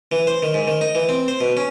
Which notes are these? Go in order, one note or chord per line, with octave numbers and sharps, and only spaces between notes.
E3
C5
D#3
G#2
D#3
D#4
E3
C4
C5
B2
C#4